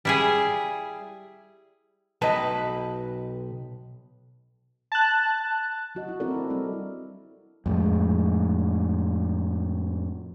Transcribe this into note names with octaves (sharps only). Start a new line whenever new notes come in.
G3 E4 G#4
B1 B4 D#5 G5 A5
A5 F#6
F#3 F#4 D#5
E4
C4 E4 A4 A#4 D5
C4 D4
G3 C4 E4
F2 A2 G#3